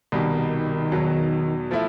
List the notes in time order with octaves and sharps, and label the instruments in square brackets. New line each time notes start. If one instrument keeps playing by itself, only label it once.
[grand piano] C2 B2 G3 [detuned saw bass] D#3
[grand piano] E2 B2 F#3
F3 A3 E4